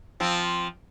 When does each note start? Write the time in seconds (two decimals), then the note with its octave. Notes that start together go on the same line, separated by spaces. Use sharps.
0.20 F3 C4